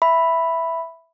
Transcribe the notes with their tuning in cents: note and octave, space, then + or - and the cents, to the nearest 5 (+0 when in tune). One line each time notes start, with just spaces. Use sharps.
E5 +0 B5 +0